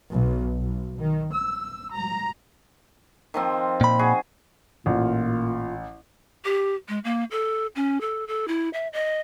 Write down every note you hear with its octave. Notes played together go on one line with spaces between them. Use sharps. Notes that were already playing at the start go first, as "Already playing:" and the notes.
B1
B1
D#3
E6
A#5
D#3 F3 C4
A#2 B5
F#4 G#4
A1 A#2 F4
G4
G#3
A#3
A4
C#4
A4
A4
E4
E5
D#5